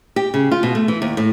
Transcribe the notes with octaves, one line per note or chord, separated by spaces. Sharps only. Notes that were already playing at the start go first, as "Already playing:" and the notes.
G4
C#3
F4
B2
A3
E3
D#2
A2